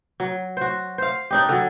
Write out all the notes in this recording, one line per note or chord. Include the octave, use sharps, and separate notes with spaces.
F#3
F#4 C5
C5 F5
D4 D#4 G4
D3 F#3